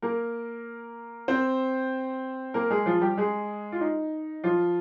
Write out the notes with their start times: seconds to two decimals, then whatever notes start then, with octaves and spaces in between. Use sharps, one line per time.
0.02 A#3 A#4
1.28 C4 C5
2.54 A#3 A#4
2.70 G#3 G#4
2.86 F3 F4
3.01 G3 G4
3.17 G#3 G#4
3.72 F4
3.81 D#4
4.44 F3 F4